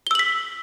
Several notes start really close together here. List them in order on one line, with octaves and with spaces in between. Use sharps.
G7 E6 F#7 B6